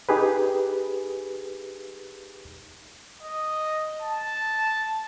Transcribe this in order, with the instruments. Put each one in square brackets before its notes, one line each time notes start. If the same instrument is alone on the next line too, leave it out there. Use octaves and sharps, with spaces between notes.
[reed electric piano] D#4 G4 G#4 B4
[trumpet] D#5
A5